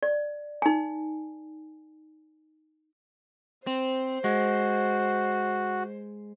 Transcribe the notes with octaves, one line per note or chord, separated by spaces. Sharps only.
D5
D#4 G#5
C4 C5
G#3 F#4